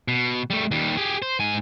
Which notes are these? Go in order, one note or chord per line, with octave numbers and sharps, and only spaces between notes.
B2
G3 A3
D#2 G3
G4 G#4
C5
G#2 G#5